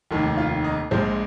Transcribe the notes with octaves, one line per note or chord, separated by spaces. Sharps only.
F1 D#2 D#3
F4
D#4
A#1 A#2 G#3 C5